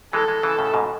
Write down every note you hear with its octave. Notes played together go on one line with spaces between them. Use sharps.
E3 G#3 A4
E3 G#3
C#3 E3
A2 C#3
G#2 B2